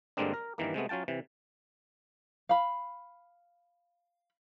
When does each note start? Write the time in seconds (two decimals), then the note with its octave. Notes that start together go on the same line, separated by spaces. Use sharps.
0.17 G2 D3 G#3 A#3 C4 D4
0.34 A#4
0.58 G2 D#3 E3 A#3
0.74 C3 G#3 A3 B3
0.89 F#3 C#4 F4 G5 A5
1.08 C3 E3
2.49 F5 B5